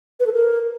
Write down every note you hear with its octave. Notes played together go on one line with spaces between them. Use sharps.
B4
A4
A#4